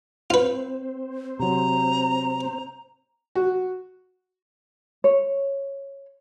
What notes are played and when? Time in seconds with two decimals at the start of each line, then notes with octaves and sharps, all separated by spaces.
0.30 C4 F4 B4 C5
1.40 C3 F#3 A#5
3.35 F#4
5.04 C#5